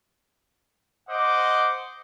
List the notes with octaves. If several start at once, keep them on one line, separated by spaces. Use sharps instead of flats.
C5 D#5 F#5 D6